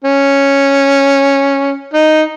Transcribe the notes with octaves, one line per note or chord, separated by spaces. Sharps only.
C#4
D#4